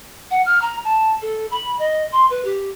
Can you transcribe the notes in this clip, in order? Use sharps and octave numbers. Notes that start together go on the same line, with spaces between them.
F#5
F6
A#5
A5
A4
B5
D#5
C6
B4
G4